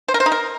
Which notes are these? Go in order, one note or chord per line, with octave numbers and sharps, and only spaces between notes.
C5
A#4
C5
D#4
A#4